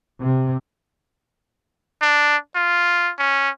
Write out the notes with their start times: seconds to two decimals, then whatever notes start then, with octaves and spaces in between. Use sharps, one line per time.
0.21 C3
2.02 D4
2.55 F4
3.19 C#4